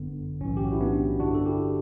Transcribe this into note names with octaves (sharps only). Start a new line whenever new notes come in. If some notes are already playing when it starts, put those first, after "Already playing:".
Already playing: G1 F#2 D3 B3
B1 A2 E3 C#4
G4
F#4
E4
B3 D4
G1 G2 D3 D4 F#4
A4
E4 G4